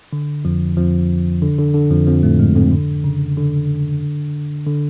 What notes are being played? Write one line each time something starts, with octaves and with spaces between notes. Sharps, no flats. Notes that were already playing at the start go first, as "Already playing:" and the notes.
D3
F2 F3
F2 F3
D3
D3
D3
F2 F3
F2 F3
A2 A3
G#2 G#3
F2 F3
D3
C#3
D3
D3